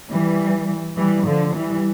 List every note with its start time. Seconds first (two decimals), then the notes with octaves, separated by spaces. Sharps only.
0.10 E3 G3
0.97 E3 G3
1.27 D3 F3
1.56 E3 G3